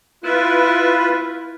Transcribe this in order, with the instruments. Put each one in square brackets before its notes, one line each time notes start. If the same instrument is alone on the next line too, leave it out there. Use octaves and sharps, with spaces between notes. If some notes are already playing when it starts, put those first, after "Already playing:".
[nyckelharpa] E4 [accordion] F4 B4